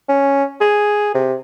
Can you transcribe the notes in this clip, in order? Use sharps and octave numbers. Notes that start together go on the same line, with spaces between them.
C#4
G#4
C3